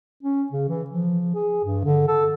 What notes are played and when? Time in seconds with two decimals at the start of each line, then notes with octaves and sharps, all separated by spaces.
0.23 C#4
0.52 C#3
0.69 E3
0.90 F3
1.35 G#4
1.64 G2
1.85 D3
2.07 A4